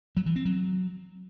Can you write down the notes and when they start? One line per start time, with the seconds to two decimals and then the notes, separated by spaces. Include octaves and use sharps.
0.17 F#3
0.26 E3
0.36 C4
0.45 F#3